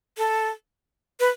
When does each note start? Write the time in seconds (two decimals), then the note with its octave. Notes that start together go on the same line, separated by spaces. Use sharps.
0.18 A4
1.20 B4